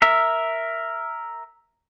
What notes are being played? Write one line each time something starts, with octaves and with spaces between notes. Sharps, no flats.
A#4 E5